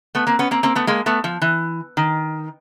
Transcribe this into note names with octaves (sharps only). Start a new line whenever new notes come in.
A3 B3
A#3 C4
B3 C#4
A#3 C4
A#3 C4
A3 B3
G#3 A#3
A3 B3
F3
E3
D#3